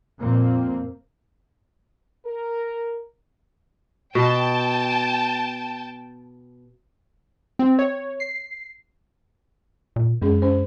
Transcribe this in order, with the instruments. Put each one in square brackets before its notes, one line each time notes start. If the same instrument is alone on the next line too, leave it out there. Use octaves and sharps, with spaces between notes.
[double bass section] F2 A#2 A#3 C4
[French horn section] A#4
[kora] B2 [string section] G5 A5
[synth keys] C4
C#5
C7
[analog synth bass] A#2
[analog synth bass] F#2 [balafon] G#3 C#4 G#4
[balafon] C#4 C5